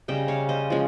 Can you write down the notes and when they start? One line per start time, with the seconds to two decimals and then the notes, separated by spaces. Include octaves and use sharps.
0.08 C#3 G3 C#4 D#5 G5
0.28 C#5 F5
0.49 C5 D#5
0.70 F3 G#3 C#4